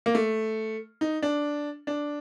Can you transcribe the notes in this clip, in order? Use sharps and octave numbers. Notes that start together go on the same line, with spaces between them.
A#3
A3
D#4
D4
D4